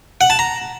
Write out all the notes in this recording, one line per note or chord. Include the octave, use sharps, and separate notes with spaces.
F#5
A5
A#5